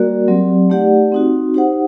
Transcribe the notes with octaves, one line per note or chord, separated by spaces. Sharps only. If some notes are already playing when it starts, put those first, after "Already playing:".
Already playing: G3 A#3 F#4 A#4 D5
F#3 C4 G4 D5
A3 D#4 G4 D5 F#5
C4 D#4 F#4
D#4 G4 C5 F#5